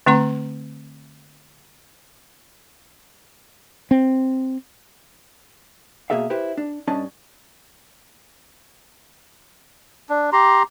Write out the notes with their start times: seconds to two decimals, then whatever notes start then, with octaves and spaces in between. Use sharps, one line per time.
0.06 D3 A3 C4 A#5 C6
3.91 C4
6.10 B2 G#3 A#3 G#4 E5 F5
6.30 E4 G4 B4 C5
6.58 D4
6.88 G2 C#4 D4 D#5 A5
10.09 D4
10.33 G4 A#5 C6